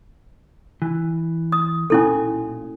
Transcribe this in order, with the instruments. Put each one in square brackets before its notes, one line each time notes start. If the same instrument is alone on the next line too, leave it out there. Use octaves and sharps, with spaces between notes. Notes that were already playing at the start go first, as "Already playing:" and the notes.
[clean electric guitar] E3
[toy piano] D#6
[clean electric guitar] B1 A#2 G#5 [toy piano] C#4 E4 A4